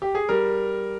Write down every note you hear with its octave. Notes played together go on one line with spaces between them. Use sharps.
G4
G#4
G3 A#4